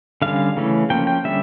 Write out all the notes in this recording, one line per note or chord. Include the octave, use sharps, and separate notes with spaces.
D3 G3 C#4 F5
C#3 E3 A3 C#4
F3 A#3 C#4 G5
G5
D3 G3 C#4 E5